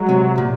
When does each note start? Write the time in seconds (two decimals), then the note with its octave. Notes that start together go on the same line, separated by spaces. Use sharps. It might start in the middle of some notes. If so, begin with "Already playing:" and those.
Already playing: F#3 G#3
0.09 C3
0.38 A#2